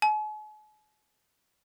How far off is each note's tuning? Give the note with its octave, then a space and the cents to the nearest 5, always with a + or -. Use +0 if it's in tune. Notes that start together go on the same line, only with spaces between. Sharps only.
G#5 +45